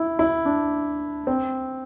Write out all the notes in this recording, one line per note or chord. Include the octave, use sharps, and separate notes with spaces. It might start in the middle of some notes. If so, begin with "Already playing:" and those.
Already playing: E4
E4
D4
C4